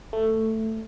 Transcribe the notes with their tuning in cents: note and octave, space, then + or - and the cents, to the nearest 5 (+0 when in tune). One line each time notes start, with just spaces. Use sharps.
A3 +10